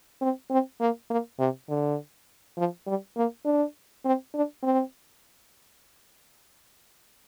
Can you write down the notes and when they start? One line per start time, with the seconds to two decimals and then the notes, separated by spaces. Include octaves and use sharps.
0.22 C4
0.51 C4
0.81 A#3
1.10 A#3
1.40 C3
1.69 D3
2.58 F3
2.87 G3
3.17 A#3
3.46 D4
4.05 C4
4.34 D4
4.63 C4